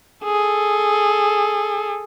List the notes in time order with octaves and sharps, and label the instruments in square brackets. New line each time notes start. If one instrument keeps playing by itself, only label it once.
[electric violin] G#4 A4